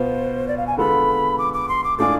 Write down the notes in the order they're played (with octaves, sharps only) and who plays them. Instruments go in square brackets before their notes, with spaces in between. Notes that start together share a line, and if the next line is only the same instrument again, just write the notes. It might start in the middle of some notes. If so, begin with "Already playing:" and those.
Already playing: [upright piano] B2 B3 F4 [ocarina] C5
[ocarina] D5
F5
G#5
[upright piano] D3 G#3 B3 F4 A4 [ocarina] B5
[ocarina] D6
D6
C6
D6
[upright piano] A2 G#3 D4 F4 G#4 [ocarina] D6